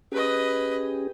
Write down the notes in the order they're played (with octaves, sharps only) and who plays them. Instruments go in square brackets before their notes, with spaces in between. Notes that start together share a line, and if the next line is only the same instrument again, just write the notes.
[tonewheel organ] C#4 G4 G#4 [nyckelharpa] B4 D#5